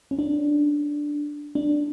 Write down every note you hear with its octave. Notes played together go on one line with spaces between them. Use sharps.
C#4
D4
D4